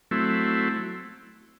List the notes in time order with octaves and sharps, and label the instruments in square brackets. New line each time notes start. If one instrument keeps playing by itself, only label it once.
[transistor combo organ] F#3 A3 C4 E4